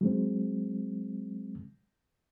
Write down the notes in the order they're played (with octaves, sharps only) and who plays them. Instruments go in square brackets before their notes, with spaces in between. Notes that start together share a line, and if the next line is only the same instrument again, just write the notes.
[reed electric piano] F#3 G#3 C4